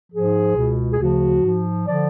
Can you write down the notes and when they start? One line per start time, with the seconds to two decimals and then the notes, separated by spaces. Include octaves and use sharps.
0.11 G#2 F3 G#4
0.56 C#2 B2
0.91 G#4
0.99 D2 C#3 F3 F#4
1.42 G#2 F3
1.86 D3 F3 D5